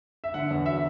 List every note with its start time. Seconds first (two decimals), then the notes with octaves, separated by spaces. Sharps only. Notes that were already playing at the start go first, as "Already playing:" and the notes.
0.24 E5
0.34 D3 F#5
0.50 E2
0.66 F#3 E5